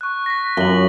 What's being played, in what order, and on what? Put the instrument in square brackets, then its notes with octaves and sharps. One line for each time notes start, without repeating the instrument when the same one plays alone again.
[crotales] C#6 F#6
A#6 B6
[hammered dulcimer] F#2 [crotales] F#7 G7